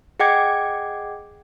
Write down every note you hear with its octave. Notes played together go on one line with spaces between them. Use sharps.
G#4 D#5 F#5 G5 D6 G#6